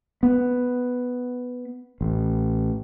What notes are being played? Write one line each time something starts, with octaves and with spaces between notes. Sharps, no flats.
B3
A1